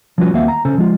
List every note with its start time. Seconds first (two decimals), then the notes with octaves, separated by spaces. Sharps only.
0.18 F3 G3 C#4 F4 F#4 B4
0.34 D#2 A#3 C4 F#4 E5 F5
0.48 A#5
0.65 C#3 C#4 A4 C5
0.78 F3 G#3 F4